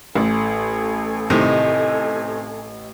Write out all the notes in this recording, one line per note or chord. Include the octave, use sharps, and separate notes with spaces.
A1 A4 G#5
A2 C3 D#3 D#5